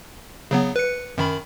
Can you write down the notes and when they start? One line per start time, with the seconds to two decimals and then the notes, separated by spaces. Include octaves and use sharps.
0.51 C#3 F#3 B3
0.76 B4 C#7
1.18 F#2 D#3 B5